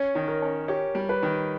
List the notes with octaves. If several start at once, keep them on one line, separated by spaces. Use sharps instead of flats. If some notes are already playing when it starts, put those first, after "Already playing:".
Already playing: C#4 C#5
D#3
A#4
C#4
G4 C#5
G3
B4
D#3